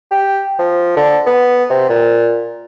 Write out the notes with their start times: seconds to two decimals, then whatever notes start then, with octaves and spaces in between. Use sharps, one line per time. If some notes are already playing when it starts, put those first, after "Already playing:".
0.11 G4
0.59 F3
0.96 D3
1.26 B3
1.70 C3
1.89 A#2